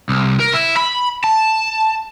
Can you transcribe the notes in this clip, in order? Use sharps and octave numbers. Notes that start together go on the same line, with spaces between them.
C2
A#4
E4
B5
A5